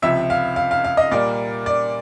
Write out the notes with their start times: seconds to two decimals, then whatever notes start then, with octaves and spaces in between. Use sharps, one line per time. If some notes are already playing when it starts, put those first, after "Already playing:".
0.02 C#2 C3 F3 E5
0.30 F5
0.56 F5
0.71 F5
0.84 F5
0.97 D#5
1.12 A#2 G3 A#3 D5
1.66 D5